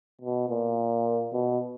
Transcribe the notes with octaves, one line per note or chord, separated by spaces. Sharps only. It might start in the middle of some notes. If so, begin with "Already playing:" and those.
B2
A#2
B2